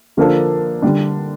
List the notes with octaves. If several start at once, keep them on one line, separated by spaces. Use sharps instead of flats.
D3 F3 A#3 D4 A4
D3 G3 D4